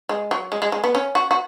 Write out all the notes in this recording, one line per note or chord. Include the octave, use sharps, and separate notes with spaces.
G#3
F#3
G#3
G#3
G#3
B3
C#4
F#4
F#4